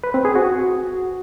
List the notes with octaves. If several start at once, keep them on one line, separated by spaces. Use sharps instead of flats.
B4
C4
G#4
F#4